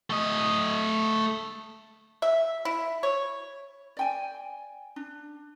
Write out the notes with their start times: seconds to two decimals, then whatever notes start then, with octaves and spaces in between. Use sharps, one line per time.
0.10 A3 D#5
2.22 E5
2.65 E4
3.03 C#5
3.97 D5 G5 G#5
4.96 D4